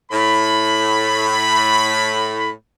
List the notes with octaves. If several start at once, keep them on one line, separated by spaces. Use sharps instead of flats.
A2 B5